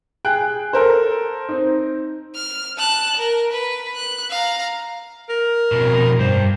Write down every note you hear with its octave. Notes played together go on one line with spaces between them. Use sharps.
G#4 G5 F#6
A4 A#4 C5
C4 D#4
F6
A5 F#6
A#4
B4
F#6
F5 A#5
A#4
F2 B2
G2 C5